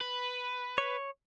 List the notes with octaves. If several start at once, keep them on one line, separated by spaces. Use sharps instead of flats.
B4
C#5